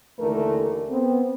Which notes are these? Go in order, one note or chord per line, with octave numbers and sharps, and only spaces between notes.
D#2 D3 E3 A3 A#4
B3 C4